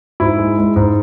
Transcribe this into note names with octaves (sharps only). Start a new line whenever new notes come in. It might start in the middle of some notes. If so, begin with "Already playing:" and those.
G#2 E4
G#3
G#3
G#2